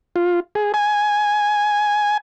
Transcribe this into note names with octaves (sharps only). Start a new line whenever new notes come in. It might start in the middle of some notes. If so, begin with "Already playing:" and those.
F4
G#4
G#5